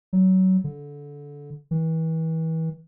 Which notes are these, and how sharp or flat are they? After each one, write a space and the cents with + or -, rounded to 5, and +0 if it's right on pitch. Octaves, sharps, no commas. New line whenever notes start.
F#3 +20
D3 -20
E3 -35